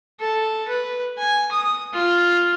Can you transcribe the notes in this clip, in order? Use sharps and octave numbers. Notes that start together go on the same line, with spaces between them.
A4
B4
G#5
D#6
F4